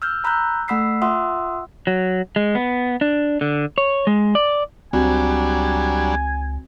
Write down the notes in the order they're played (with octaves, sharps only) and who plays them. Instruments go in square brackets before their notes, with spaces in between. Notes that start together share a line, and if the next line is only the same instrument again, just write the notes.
[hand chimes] E6 F6 G6
A#5 B5 E6 F#6 G6
A3 F#5 B5 E6 B6 C7
F4 E5 F#5 C6 D#6 E6
[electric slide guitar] F#3
G#3
B3
D4
D3
C#5
G#3
D5
[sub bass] C#2 [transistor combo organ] F#3 G3 D4 [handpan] C4 F#4 [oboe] G#5